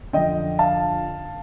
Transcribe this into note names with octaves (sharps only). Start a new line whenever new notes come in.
F2 D3 D#5 G5
F5 A5